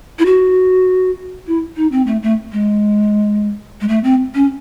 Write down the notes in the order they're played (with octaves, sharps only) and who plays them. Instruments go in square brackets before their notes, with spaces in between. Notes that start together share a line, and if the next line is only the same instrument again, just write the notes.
[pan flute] E4
F#4
E4
D#4
C4
A3
A3
G#3
G#3
A3
C4
C#4